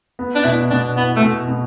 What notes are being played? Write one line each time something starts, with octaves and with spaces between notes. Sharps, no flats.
B3
D4
B2 E4
B2 D4
B3 E4
A3
B2
B2